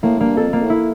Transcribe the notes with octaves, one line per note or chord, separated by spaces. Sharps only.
A2 A#3
G2 A#3
F2 A4
F2 A#3
A2
E4